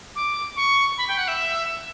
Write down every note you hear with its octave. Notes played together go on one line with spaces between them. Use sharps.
D6
C#6
B5
G5
F#5
E5